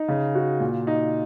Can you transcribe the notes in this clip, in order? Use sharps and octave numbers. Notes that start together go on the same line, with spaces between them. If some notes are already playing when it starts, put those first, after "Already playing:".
Already playing: D#4
C#3
F#4
A#2
D#4